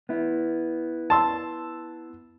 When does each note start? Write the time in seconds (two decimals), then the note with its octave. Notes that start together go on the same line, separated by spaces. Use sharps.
0.09 B3 E4
1.10 A5 C6 E6